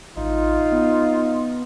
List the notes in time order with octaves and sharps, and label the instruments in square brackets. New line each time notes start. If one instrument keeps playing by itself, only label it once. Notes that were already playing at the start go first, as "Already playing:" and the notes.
[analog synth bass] A1 [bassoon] D#4 [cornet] F4
[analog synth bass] B3